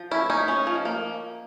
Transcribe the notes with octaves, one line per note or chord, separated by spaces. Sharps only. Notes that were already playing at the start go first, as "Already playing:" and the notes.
Already playing: F3
C#4 E4
C#4 D#4
C#4
F3
A#3